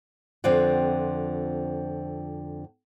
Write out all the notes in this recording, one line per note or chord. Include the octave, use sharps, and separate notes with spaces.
F2 D3 C4 F4 D5 F#5